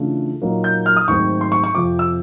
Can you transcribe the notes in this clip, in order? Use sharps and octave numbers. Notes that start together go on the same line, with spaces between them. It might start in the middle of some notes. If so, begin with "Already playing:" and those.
Already playing: C#3 E3 A3 D4 F4
A#2 F#3 A#3 D#4
G6
F6
D#6
G#2 D#3 F#3 A3 C4 C#6
C6
C#6
C#6
F2 C3 F3 D6
E6